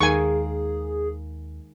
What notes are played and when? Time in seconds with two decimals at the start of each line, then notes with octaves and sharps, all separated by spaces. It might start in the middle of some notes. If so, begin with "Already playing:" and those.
0.01 D#2 D#3 G#3 A#3 G#4 G#5 C#6